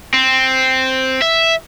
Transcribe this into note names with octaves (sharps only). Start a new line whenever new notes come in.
C4
E5